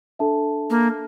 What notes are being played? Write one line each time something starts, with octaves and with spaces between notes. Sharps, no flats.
D4 A4 E5 A5
A#3